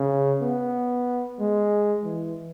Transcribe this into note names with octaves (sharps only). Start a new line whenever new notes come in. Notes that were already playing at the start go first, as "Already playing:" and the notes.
Already playing: C#3
B3
G#3
E3